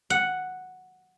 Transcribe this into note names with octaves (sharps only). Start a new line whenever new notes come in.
F#5